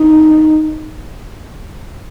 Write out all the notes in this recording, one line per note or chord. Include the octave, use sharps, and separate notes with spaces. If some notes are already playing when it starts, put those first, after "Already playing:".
Already playing: D#4